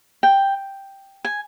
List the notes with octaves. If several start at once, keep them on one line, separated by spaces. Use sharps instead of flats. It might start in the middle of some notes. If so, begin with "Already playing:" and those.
G5
G#5